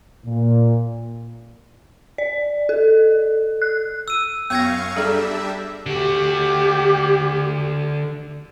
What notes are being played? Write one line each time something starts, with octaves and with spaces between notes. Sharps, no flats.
A#2
D5
A4
F#6
E6 D#7
F#2 B3 F5 C#6 E6 G#6 A#6
G3 D4 G#4 A4 E5 A#5
D3 F#4 G4